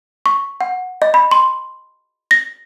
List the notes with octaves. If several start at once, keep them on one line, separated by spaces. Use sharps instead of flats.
C#6
F#5
D#5
B5
C6
A#6